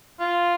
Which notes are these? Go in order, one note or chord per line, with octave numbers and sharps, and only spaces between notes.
F4